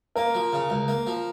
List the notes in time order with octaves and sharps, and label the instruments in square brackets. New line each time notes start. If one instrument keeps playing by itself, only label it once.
[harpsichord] A#3 [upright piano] A#4
[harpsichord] F3
C#3
C#2
A#3
F3